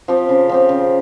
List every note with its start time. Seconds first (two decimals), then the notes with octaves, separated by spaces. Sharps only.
0.08 F3 C4 G4
0.29 C#3
0.49 F3 C4 G4
0.69 C#3